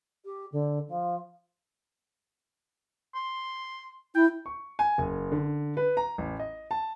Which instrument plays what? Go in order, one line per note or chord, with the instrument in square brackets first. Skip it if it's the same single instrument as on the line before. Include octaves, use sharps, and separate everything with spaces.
[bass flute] G4
D3
F3
[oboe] C6
[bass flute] E4 [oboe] G5
[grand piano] C#6
G#5
F#1
D3
B4
A#5
A1
D#5
A5